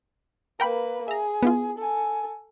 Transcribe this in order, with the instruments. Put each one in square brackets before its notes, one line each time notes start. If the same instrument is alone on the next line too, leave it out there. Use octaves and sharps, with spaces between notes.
[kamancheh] A#3 B4 [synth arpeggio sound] A#4 G5 B5
[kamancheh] G#4 [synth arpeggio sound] E5 A#5
[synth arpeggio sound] B3 E4 F4
[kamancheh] A4 G#5